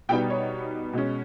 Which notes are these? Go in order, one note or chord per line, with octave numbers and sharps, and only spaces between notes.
B2 G3 B3 D#4 G5
C#5
B2 G#3 C#4